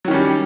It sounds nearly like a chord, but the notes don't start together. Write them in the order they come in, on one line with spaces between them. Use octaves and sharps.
F#3 D#3 C#4 G3